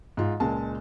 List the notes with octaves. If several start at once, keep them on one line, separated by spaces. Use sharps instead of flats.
G#2 F4
C#2 A#2 G#3 A5